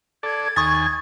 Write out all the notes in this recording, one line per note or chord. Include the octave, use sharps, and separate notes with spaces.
A4 D5 G#6
D#2 G#5 C#6 D#6 A6